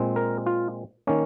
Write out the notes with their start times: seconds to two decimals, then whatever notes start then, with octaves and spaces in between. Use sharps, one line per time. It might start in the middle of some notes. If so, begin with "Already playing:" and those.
Already playing: A#2 G#3 C4
0.16 A#4
0.46 F4
1.07 D#3 A#3 C#4